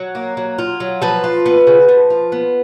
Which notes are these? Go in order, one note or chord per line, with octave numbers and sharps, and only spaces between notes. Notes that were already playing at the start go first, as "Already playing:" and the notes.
Already playing: F#3
A#3
F#3
F4
F#3
F3 B4
F4
B3
C#3
F3
F4
B3